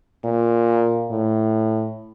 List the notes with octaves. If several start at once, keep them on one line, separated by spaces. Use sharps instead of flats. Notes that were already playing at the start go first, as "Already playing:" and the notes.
A#2
A2